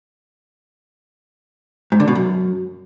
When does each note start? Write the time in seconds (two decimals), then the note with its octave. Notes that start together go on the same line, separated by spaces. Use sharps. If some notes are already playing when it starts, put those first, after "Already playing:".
1.92 G#2
2.00 D3
2.08 B2
2.15 F#2